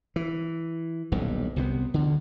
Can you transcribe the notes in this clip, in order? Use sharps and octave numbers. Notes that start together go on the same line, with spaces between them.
E3
D#1 B1 G2
C2 C3 B3
D2 D3